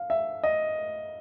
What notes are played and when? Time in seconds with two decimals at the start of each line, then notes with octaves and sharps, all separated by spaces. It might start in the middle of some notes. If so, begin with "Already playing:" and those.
Already playing: F5
0.10 E5
0.43 D#5